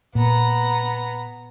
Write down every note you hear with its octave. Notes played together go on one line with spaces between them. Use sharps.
A#2 B3 A#5